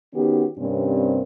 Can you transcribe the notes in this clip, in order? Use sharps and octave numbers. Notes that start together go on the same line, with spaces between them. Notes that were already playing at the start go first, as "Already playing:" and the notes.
D#3 B3 C#4 F#4 G4
G2 C3 A#3 C4 C#4